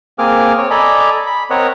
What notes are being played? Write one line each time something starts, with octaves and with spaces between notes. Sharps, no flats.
A#3 C4 G#4 D6 F6
C4 C#5
A4 D5 D#5 G#5 A#5 B5
B5
C4 A#4 C#5 D#5 F#5